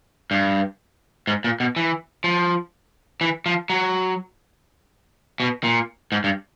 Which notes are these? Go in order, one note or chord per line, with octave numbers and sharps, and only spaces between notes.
G2
G#2
A#2
B2
E3
F3
E3
F3
F#3
B2
A#2
G#2
G2